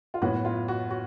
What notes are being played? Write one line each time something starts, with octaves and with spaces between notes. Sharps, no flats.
F4
A2 F#3 B3 F#4
F4
F#4
F#4